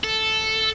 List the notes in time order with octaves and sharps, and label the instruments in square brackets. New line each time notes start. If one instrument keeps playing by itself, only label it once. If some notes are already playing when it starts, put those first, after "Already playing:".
[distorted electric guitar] A4